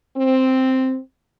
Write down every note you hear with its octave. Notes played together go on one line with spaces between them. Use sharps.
C4